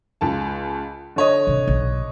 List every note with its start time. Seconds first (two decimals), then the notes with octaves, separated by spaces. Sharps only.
0.21 C#2 A5
1.16 D3 C#5 D#5
1.47 C3
1.67 B1